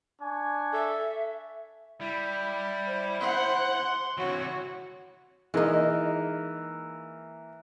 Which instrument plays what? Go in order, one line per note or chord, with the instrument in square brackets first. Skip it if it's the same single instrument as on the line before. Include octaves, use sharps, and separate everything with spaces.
[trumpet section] D4 G#5 C#6
[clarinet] A4 [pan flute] E5
[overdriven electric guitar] G3 [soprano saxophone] E4
[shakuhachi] C5
[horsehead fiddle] F#5 [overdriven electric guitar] C6
[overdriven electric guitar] C3 E3 [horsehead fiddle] F#4 [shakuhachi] C#5
[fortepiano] E3 A#3 [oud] G#3 D#4